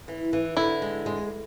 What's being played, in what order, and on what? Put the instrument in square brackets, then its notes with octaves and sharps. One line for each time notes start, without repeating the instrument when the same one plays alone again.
[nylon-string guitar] E3
E3
[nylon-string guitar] D3 [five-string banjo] E4
[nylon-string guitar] G#3
G#3